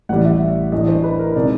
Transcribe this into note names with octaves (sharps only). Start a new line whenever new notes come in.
A1 A2 E3 G3 F#5
E5
A2 E3 A3 D4 D#5
C5
B4
A#4
B2 G#3 C4 D#4 D5